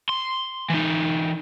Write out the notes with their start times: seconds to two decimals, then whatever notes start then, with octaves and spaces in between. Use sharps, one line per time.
0.09 C6
0.70 E3 D#4